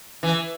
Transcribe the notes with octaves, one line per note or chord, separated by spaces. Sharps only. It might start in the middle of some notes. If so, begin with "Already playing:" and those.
E3